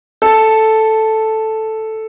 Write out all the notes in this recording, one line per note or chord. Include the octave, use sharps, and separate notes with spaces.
A4